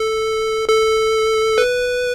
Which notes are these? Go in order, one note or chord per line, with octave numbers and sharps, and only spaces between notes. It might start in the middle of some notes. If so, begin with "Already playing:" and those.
Already playing: A4
A4
B4